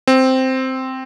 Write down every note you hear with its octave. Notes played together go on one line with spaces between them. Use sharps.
C4